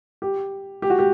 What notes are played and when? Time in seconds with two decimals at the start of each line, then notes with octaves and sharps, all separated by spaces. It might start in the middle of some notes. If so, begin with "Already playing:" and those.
0.22 G4
0.82 G4
0.90 F#4
0.99 G4